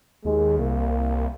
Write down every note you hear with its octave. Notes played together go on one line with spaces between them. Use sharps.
D#2 G#3
C2 A#3